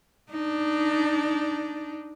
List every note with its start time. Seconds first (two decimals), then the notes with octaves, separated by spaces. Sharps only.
0.31 D4 D#4